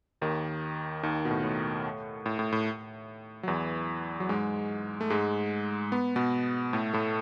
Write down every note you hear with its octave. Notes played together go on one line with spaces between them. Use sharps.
D#2 D#3
D#2 D#3
B2
A2
A2
A2
A2
A2
F#3
E2 E3
F#3
G#2 G#3
A3
G#2 G#3
B3
B2 B3
A2 A3
A2 A3